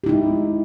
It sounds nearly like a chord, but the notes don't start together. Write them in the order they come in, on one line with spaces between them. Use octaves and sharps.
G4 E4 D#4 G#3